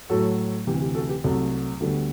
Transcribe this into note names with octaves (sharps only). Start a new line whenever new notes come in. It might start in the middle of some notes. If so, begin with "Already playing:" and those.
A2 F#3 A3 F#4 A4
D2 C3 E3 G4
G4
F#4 A4
G4 B4
C2 C3 F#3 A3 F#4 A4
D2 D3 G3 B3 F#4 A4